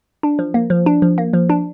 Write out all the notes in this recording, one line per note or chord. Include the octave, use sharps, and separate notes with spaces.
D4
F3
A#3
F3
D4
F3
A#3
F3
D4